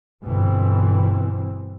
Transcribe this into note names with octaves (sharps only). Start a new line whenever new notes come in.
G1 B2 E3 C4